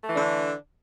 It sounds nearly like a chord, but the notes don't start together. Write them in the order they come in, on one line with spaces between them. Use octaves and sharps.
A3 E3 D4 D3